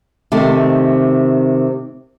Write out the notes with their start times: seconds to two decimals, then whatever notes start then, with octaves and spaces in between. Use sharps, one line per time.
0.32 C3 D#3 A3